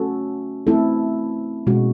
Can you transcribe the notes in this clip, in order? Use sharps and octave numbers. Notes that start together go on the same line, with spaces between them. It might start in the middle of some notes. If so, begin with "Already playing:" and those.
Already playing: A3 C#4 F#4 A4
A3 C4 E4 A4
B2 G#3 C#4 F#4